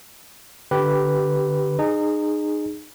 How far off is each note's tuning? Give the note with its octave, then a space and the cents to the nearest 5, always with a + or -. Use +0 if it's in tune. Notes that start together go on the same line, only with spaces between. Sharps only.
D3 +0 G4 -10 B4 -5
D#4 -30 G#4 -5